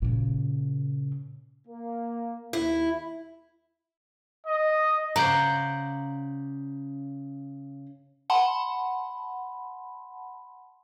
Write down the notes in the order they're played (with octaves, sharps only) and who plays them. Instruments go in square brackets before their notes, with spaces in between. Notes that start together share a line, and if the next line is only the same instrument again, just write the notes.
[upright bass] A#2 C#3
[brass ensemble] A#3
[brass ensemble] D#2 [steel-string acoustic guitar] E4
[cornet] D#5
[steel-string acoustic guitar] C#3 [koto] C5 D5 F#5 [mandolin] A#5
[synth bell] F#5 A5 B5 C6